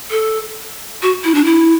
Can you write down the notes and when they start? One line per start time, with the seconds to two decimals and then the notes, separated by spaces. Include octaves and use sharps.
0.11 A4
1.02 F#4
1.24 E4
1.35 D4
1.44 E4